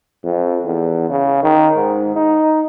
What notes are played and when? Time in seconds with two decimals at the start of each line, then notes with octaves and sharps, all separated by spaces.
0.24 F2
0.65 E2
1.10 C#3
1.43 D#3
1.76 G#2
2.16 D#4